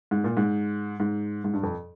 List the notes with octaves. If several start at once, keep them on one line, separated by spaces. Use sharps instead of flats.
G#2
A#2
G#2
G#2
G#2
G2
F2